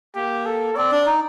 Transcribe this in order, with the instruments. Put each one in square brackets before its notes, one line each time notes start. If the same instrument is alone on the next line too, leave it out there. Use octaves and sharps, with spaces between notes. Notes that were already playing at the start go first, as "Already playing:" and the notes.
[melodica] A#3 [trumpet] G4
[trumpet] A4
[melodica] C4 [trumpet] D5
[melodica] D4
D#4